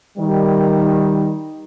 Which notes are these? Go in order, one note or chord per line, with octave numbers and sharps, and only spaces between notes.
D#3 G3